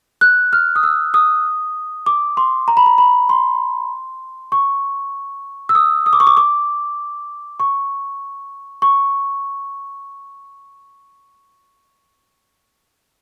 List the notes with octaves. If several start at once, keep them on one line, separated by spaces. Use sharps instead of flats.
F#6
F6
D#6
E6
D#6
D6
C6
A#5
B5
A#5
B5
C6
C#6
E6
D#6
D#6
D6
C#6
D6
D6
C#6
C#6